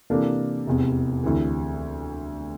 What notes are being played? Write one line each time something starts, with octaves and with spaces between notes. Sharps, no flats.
C3 E3 A#3 D4 A4
F1 E2 C3
D2 C3 E3